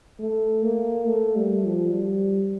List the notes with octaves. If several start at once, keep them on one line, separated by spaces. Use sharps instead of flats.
A3
A#3
A3
G3
F3
G3